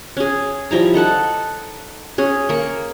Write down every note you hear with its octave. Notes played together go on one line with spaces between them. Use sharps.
C#4 G#4
F3 G3 E4 A#5
D#4 A4 F#5 A5
C#4 G#4
A#3 C#6